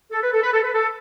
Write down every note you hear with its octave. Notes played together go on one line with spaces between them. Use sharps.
A4
B4
A4
B4
A4
B4
A4